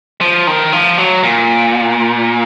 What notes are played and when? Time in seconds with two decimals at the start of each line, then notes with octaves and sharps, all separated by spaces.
0.21 F3
0.47 D#3
0.72 F3
0.98 F#3
1.23 A#2